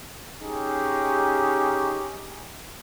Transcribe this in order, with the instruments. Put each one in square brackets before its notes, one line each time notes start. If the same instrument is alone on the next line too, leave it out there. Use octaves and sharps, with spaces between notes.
[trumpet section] C#4 D#4 G4 G#4